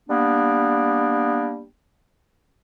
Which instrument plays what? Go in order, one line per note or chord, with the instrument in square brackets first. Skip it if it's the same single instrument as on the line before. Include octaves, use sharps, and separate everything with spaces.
[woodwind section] G3 A#3 B3 D4